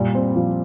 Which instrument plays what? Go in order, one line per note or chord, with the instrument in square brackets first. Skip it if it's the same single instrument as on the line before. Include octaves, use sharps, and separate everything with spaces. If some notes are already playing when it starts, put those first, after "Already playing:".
Already playing: [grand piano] A#2 G3
C4
F3